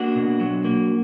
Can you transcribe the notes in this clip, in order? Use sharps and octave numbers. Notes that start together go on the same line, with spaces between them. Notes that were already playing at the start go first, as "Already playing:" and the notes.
Already playing: A#3 D4 F#4
B2
F#3
A#3